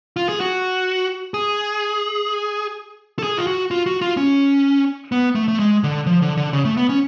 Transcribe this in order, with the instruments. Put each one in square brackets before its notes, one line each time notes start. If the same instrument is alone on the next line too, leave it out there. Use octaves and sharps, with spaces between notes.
[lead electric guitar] F4
G#4
F#4
G#4
A4
G#4
F4
F#4
F4
F#4
F4
C#4
B3
A3
A3
G#3
D3
F3
D3
D3
C#3
A3
B3
C#4